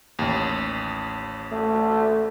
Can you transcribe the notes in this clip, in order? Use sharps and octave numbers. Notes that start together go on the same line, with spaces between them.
A1 D#2
A3